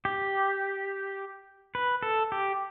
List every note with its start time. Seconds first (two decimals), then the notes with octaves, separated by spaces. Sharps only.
0.05 G4
1.75 B4
2.03 A4
2.32 G4